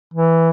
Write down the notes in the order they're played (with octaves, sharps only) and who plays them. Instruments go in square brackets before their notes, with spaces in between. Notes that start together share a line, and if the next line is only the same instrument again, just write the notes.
[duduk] E3